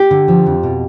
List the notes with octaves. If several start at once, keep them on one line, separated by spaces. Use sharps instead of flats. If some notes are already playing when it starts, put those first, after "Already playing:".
Already playing: G4
D3
F3
F2
B2